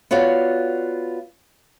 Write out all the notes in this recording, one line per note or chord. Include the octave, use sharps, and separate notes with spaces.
B3 F4 F#4 C#5 D5